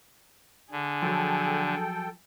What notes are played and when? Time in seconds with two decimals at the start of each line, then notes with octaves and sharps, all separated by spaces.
0.72 D3 G#4
1.02 F3 F#3 A4 G5